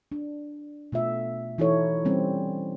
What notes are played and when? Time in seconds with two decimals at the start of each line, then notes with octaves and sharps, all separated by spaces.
0.12 D4
0.92 B2 A3 F4 E5
1.58 E3 D#4 E4 F#4 A4 C#5
2.05 G3 C4 C#4